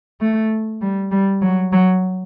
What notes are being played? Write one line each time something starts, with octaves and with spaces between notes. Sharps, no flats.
A3
G3
G3
F#3
F#3